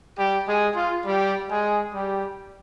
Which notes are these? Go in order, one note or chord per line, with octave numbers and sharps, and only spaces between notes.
G3 G4
G#3 G#4
F4
G3 G4
G#3 G#4
G3 G4